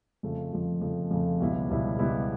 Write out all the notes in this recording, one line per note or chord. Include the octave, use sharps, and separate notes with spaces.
F2 C#3 F3 A3
F2 C#3 F3 A3
F2 C#3 F3 A3
F2 C#3 F3 A3
C#2 B2 G3 B3 E4
C#2 B2 G3 B3 E4
C#2 B2 G3 B3 E4